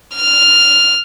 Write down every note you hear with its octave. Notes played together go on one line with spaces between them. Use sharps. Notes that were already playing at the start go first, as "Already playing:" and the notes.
F6